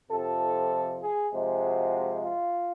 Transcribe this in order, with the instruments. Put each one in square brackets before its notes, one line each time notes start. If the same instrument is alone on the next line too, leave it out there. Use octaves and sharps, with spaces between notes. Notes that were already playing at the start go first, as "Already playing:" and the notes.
[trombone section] F2 C3 F3 A4
G#4
C3 F3 G#3
F#4
F4